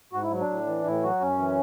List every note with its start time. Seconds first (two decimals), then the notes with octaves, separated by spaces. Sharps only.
0.13 G#2 F#4
0.23 E4
0.31 F#3
0.41 D4
0.49 A2
0.67 E3
0.85 A2 E4
1.03 F#3 F#4
1.21 F#2 C#4
1.39 E3